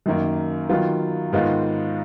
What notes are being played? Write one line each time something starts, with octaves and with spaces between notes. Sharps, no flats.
F#2 D#3 A#3
D#3 F#3 B3 F4
G#2 D#3 G#3 B3 F4